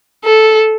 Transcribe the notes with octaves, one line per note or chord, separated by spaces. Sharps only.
A4